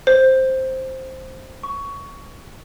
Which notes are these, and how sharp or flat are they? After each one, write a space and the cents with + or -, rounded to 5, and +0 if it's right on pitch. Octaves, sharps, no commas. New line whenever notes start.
C5 +5
C#6 +15